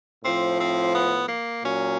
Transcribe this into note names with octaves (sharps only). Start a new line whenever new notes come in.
A2 F3 C4
C4
B3
A#3
A#2 F#3 C#4